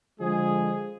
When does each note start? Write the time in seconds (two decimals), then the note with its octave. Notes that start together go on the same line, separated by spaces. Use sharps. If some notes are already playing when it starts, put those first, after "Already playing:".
0.20 D3 F3 G#3 G#4